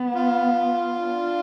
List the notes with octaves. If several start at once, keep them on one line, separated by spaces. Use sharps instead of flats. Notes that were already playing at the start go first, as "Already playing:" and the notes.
Already playing: B3
F4
D4